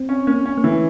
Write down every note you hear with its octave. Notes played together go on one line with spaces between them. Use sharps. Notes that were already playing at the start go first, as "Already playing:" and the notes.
Already playing: C4
C#4
A#3 C#4
C#4
A#3
E3 A3